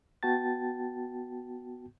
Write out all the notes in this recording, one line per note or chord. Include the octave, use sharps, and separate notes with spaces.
B3 F#4 G5 A5 A6